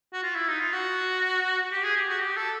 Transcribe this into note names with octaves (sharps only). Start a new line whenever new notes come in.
F#4
F4
E4
D#4
F4
F#4
G4
G#4
G4
F#4
G4
A4